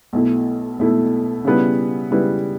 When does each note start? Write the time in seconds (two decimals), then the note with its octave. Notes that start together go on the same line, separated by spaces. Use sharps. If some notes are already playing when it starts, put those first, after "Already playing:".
0.13 B1 B2 A3 E4
0.79 B1 B2 A3 E4
1.45 C#3 G3 B3 E4 B4
2.11 C#3 G3 B3 E4 B4